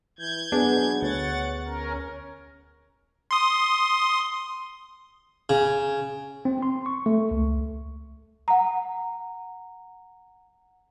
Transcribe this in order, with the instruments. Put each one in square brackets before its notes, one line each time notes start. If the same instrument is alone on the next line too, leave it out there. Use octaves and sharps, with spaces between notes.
[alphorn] E3 [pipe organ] G6 G#6
[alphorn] F#3 [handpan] B3 G#4 [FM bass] D4
[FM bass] D2 [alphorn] C#5 [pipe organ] F#5 A6
[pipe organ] C#4 A#4
[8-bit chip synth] C6 D#6
[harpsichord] C#3
[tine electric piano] C4
C6
C#6
A3
C#2
[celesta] F#5 A#5